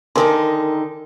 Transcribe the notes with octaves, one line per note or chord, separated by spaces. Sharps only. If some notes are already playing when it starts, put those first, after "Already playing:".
D3 D#3 D#4 A#4 G#5 C6